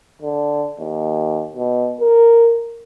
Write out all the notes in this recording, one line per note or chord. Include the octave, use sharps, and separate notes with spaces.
D3
D#2
B2
A#4